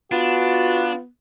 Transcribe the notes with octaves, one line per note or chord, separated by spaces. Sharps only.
B3 D4 F4 F#4